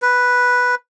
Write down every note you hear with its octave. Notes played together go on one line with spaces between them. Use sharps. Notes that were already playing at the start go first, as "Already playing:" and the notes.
B4